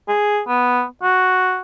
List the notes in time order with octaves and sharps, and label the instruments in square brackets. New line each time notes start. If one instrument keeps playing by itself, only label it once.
[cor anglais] G#4
B3
F#4